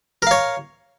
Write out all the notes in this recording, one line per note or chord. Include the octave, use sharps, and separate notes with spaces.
A#4 C#5 F5